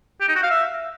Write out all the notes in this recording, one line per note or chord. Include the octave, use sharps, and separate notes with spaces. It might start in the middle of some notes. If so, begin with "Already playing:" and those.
G4
D#4
F#4
F5
E5